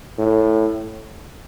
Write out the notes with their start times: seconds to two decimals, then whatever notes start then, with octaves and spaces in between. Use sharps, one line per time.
0.18 A2